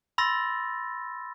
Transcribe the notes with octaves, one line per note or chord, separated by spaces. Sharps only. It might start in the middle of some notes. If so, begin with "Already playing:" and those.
B5 C6 E6 A6 A#6